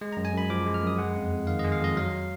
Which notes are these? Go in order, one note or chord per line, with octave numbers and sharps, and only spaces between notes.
G#3
F#2 A#5
G#5
F#2 B5
F3 D6
G#3
F6
F#2 D#6
G#3 F#5
F2
F2
D#3 F5
G#3 D#5
F5
F2 D#5
F#3 F5